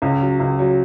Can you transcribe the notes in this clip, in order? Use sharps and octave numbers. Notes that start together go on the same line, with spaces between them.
C#2
F#3
C#2
F#3